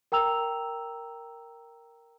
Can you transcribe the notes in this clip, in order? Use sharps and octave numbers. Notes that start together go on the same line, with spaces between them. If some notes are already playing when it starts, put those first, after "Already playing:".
A#4 G5 A#5 E6 F7